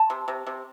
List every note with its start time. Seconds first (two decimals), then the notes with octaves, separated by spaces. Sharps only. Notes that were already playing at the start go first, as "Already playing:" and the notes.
Already playing: A5
0.10 C3
0.28 C3
0.47 C3